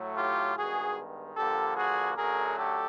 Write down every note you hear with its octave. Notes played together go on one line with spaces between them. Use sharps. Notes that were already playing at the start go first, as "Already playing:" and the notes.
Already playing: A2 F#3 A3
F4 G4
G2 D#3 G#3 B3 F#4 G#4
G2 D3 F3 A#3 G4 A4
F#4 G#4
F#2 D3 F#3 A3 G#4 A#4
G4 A4